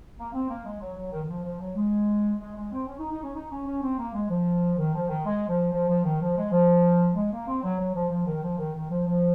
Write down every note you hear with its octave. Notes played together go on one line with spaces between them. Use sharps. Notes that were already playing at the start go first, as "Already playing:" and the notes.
A#3
C4
A#3
G#3
F#3
F#3
D#3
D#3
F3
F3
F#3
G#3
G#3
G#3
C4
C#4
D#4
D#4
C#4
D#4
C#4
C#4
C4
A#3
G#3
F3
D#3
F3
D#3
G#3
F3
F3
F3
D#3
F3
G#3
F3
G#3
A#3
C4
F#3
F#3
F3
F3
D#3
F3
D#3
D#3
F3
F3